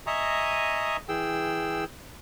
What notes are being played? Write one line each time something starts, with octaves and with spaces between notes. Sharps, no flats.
D#5 E5 G#5 A#5 C#6 D#6
E3 G#4 G5 E6